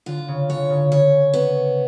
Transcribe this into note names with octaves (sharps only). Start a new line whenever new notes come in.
D3 F4
C#3
D3 C#5
C#3
C#3 C#5
B3